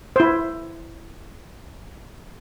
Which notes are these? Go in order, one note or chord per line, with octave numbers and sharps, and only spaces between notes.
E4 C5